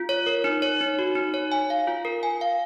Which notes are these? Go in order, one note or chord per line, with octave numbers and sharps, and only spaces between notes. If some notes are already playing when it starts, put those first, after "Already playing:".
Already playing: F4
C#5
A#4
D#4
C#5
D#4
F#4
D#4
C#5
G#5
F5
F4
A#4
G#5
F5